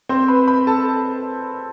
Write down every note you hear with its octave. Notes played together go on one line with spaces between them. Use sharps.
C4 C5
B4 B5
B4 B5
A4 A5